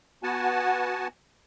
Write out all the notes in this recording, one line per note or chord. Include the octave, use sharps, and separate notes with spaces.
B3 F#4 F#5 G#5 A5